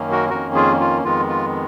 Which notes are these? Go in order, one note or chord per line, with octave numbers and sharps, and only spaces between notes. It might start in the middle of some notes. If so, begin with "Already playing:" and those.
Already playing: F#2 D#3 A#3 C#4
F#4 A#4
F2 D#3 A#3 C#4 F#4 A#4
F4 G#4
F4
F2 D#3 G#3 B3 F4
F4